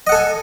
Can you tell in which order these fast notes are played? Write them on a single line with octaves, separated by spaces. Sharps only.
D#5 F#5 A4 G#5